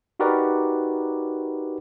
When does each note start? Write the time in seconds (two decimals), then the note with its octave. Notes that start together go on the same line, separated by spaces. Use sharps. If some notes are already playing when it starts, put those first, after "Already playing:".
0.19 D#4 F#4 G4 A#4 B4 D5